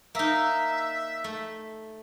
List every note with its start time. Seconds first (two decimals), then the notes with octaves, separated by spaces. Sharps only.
0.15 A#3 D#4 E5
1.24 A3